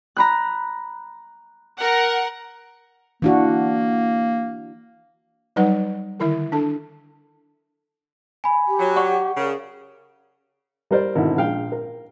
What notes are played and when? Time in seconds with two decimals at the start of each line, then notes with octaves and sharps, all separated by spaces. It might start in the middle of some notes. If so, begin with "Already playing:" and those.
0.17 A#5 B5 F#6
1.79 A#4 F#5
3.22 E3 A#3 D4 F#4
5.56 F#3 G3 D#4 B4 F#5
6.20 D3 D#3 E4 A#4 E5
6.52 D4 A4 A5
8.44 G#5 B5
8.67 G4
8.79 F#3
8.96 D5 F#5 C#6
9.37 C#3 A#4
10.91 G3 A#4 C5 D5
11.15 G#1 B2 D3 E4 A#4
11.36 A#1 G#3 F5 G5
11.72 A#4